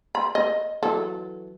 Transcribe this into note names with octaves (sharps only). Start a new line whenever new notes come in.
B5
D#5
E3 F#3 A4